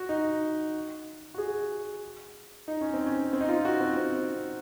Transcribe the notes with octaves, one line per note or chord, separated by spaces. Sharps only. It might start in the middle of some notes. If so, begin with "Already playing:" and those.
Already playing: F#4
D#4
F#4
G#4
D#4
C#4
C4
C#4
C4
D#4
F4
F#4
C4
C4